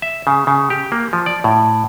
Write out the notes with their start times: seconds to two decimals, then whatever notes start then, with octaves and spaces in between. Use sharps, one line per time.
0.02 E5
0.27 C#3
0.47 C#3
0.70 G4
0.92 A#3
1.13 F3
1.26 D5
1.44 A2